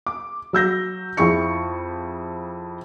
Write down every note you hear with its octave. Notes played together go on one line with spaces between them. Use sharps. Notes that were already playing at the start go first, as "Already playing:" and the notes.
D6
F#3 E6 G6 A#6
F2 E4 G#4 C#6 C#7